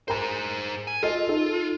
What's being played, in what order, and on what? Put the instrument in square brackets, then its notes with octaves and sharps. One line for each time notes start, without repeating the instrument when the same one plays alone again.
[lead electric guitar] G#4 C5 [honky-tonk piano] A#4 A#5
[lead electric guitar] G#5
[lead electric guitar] F4 [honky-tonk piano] A4 D#5
[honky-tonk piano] D#4 A4